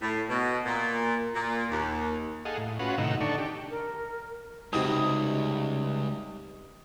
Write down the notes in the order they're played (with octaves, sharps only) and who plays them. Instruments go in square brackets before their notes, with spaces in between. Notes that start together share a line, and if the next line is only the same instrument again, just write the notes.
[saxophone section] A2
B2
A#2
A#2
D#2
[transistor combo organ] G#4 A4 D#5 F5 F#5
A2
C#4 F4 F#4 B4 F#5
A2 C3 D#3 D#4 F#5 E6
D3 D4 D#4 A4 C#6
G4
[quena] A#4
[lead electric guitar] C#2 [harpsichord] C3 G3 F#4 [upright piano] D#4 D#6